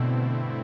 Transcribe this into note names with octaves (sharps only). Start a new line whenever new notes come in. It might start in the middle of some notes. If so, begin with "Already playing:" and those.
Already playing: G2 B2 D3 A3 C4 E4